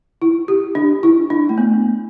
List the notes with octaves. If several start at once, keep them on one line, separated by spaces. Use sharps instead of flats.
E4
G4
D4
E4
D4
A3
B3